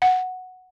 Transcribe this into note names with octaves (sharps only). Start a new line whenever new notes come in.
F#5